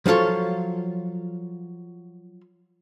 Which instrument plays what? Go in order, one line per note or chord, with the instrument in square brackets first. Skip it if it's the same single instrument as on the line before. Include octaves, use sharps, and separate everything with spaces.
[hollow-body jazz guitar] F3 F#3 F4 A4 C#5